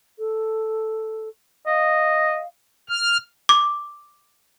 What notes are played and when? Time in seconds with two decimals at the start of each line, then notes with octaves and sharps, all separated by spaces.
0.19 A4
1.66 D#5 F5
2.89 F6
3.49 D6